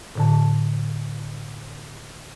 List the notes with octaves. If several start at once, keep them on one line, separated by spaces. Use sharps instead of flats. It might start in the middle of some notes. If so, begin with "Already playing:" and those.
A2 D3 A5